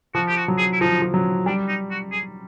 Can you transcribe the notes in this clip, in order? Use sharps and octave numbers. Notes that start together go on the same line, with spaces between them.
F3 F#4
G4
F#4
F#3
G#4
E4
F3 D#4
F3
F#3
G3 D4
D#4
F#4
G#4